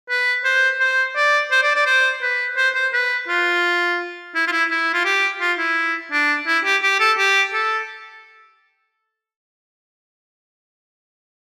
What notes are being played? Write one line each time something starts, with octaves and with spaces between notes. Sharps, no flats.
B4
C5
C5
D5
C5
D5
D5
C5
B4
C5
C5
B4
F4
E4
F4
E4
E4
F4
G4
F4
E4
D4
E4
G4
G4
A4
G4
A4